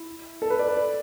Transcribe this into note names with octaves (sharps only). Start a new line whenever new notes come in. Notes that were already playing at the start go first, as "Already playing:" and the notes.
Already playing: E4
A4
B4
D5
B4
D5